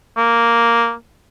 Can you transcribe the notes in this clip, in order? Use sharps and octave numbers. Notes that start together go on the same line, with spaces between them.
A#3